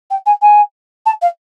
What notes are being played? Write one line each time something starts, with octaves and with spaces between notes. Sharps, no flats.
G5
G#5
G#5
A5
F5